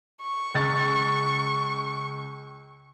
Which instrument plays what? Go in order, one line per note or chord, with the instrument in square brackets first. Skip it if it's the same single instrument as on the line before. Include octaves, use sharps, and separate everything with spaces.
[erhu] C#6
[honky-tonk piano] C#2 A6